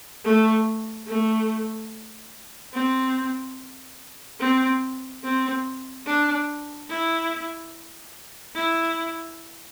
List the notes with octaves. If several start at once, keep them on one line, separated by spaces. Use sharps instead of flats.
A3
A3
C4
C4
C4
D4
E4
E4